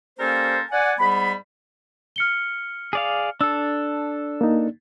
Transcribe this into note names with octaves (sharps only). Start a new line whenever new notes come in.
G3 A#3 C#4 A4 A#4 C5
D5 F#5 G#5
G#2 G3 B3 B5
F6 C#7 G7
G#4 D5 F5
D4 A4 E6
A#3 D#4